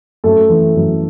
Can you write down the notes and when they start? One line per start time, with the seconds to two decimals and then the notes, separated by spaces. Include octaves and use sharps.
0.24 F#2 A3 A4
0.50 E3
0.76 F#2